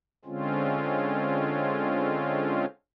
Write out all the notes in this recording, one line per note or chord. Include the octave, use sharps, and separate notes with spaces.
D3 G#3 C4 C#4 F4